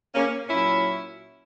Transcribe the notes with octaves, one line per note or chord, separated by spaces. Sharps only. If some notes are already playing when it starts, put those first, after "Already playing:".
A#3 C#4
A#2 F#3 C#4 E4